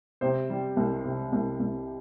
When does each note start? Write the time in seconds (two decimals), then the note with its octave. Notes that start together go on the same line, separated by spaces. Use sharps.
0.21 C3 C5
0.50 G3
0.76 C2
1.05 C3
1.32 C2
1.59 C2